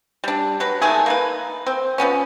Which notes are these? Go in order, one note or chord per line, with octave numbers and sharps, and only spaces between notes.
G3 D4
F#3 B4
D#3 G#3 A3 G#4
A#3 D#4 B4
C4
F3 F#3 B3 C#4